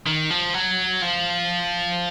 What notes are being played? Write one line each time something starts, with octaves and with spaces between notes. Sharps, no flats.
D#3
F3
F#3
F3